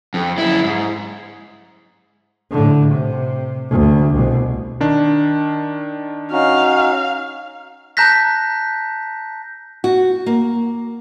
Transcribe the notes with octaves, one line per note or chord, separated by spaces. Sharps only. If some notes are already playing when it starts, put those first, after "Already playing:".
F2
F#2 E4
G#2
A2 D3
C3
D2
C2 B2
D#3 D4
C#4 D#4 F#4 F5
A5 A#5 F#6 G6 A#6 B6
F#4
A#3